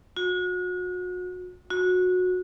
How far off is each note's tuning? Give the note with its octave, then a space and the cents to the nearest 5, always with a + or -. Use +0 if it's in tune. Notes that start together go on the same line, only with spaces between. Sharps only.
F#4 -35
F#4 -20